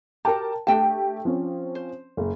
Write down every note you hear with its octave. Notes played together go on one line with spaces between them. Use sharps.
F#4 G4 A#4 G5 A5
A3 D4 G4 G5 A5
F3 C4 C#4
C5
F#1